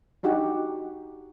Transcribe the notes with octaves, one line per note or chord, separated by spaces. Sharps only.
D4 D#4 F#4 G4 F#5